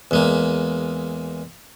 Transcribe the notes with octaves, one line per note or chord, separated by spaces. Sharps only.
E2 G#3 A#3